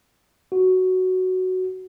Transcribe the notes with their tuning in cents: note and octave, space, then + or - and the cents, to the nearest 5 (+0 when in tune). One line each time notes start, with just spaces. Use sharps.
F#4 +5